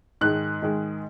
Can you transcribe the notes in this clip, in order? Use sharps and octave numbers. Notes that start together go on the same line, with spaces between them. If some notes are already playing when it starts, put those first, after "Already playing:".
G#2 D#3 G#3 F#6
G#2 D#3 G#3